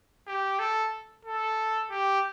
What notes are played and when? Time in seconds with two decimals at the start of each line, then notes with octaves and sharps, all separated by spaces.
0.27 G4
0.59 A4
1.25 A4
1.90 G4